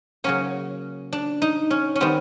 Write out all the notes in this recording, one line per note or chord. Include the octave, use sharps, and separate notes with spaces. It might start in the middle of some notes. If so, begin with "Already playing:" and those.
C#3 F#3 A#3 C#4
D4
D#4
C#4
C#4
D#3 G3 B3 C4